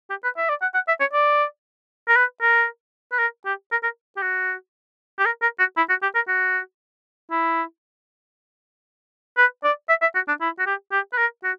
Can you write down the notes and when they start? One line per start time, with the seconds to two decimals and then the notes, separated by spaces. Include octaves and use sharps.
0.10 G4
0.24 B4
0.37 E5
0.49 D5
0.62 F#5
0.74 F#5
0.88 E5
1.00 C#5
1.13 D5
2.08 A#4
2.16 B4
2.42 A#4
3.12 B4
3.19 A#4
3.45 G4
3.71 A#4
3.83 A#4
4.17 G4
4.22 F#4
5.18 G4
5.25 A#4
5.42 A#4
5.59 F#4
5.77 E4
5.89 F#4
6.02 G4
6.15 A#4
6.28 F#4
7.31 E4
9.37 B4
9.64 D5
9.89 E5
10.02 E5
10.15 F#4
10.28 D4
10.41 E4
10.59 F#4
10.66 G4
10.92 G4
11.13 B4
11.18 A#4
11.44 F#4